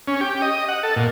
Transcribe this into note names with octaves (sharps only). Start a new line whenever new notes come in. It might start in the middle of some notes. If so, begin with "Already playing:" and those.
C#4
G4
D#5
F#5
A4
A#2